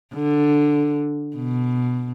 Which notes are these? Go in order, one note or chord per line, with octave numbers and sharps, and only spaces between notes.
D3
B2